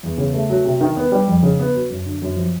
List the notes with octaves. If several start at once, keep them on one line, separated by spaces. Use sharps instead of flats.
E2
C#3
A3
F#3
C3
D#3
B3
G3
F2
C#3
B3
F#3
F#2
D3
F#2
F3